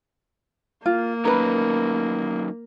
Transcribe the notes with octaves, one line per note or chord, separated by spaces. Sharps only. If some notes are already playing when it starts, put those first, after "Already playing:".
A#3 F4
F#3 C#4 D#4 A#4 B4